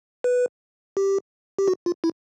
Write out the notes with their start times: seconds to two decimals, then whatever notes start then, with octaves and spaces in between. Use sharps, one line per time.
0.24 B4
0.97 G4
1.59 G4
1.68 F#4
1.86 F4
2.04 E4